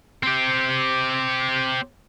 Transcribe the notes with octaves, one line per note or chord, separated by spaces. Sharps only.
C4 G4